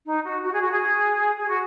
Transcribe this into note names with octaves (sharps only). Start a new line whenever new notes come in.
D#4
F#4
F#4
G#4
F#4
G#4
G#4
F#4